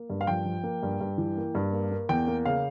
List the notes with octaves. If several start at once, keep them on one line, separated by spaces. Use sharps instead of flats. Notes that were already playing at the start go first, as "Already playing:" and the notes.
Already playing: A#3
G2
F5
F3 G5
F3
A#3
G2
G2
E3
A#3
G2
A#3
A#3
E2 G5
A#3
C#3 F5